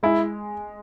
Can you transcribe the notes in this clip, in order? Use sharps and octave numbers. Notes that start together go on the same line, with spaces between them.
G#3 E4